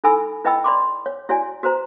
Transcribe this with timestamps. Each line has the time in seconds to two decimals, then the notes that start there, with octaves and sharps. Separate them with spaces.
0.04 D#4 E4 A4 G#5 B5 E6
0.44 E4 B4 D#5 G5 B5 E6
0.64 D5 B5 C6 D6
1.06 C#5
1.29 E4 F#4 C#5 D5 G#5
1.63 F#4 B4 C5 A#5